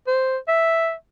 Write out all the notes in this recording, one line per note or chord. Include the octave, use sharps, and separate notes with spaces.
C5
E5